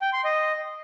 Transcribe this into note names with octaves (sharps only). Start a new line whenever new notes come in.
G5
C6
D#5